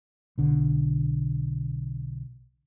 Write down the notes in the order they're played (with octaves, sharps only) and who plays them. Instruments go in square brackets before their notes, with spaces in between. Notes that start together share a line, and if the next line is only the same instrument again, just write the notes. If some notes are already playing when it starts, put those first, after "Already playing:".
[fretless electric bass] B1 D3